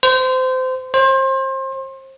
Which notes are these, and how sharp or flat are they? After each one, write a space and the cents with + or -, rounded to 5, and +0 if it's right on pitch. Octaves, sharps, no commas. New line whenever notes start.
C5 -25
C5 +30